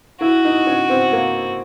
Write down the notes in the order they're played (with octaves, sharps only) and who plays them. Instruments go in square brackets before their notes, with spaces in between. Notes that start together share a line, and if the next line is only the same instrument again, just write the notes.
[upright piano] E4 [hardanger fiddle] F#4
[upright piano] D#4
C#4
C4
A#3